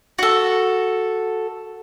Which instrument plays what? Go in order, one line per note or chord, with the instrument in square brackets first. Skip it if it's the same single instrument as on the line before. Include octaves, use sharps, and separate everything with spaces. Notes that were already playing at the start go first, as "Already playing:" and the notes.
[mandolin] F#4 A4